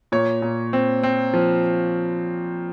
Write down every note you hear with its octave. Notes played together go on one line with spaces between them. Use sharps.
A#2 C#5
A#2
C4
C4
F3